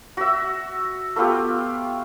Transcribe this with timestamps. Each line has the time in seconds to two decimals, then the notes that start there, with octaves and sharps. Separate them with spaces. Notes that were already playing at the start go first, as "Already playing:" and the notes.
0.17 F#4 E5
1.16 A3 B3 F4 G4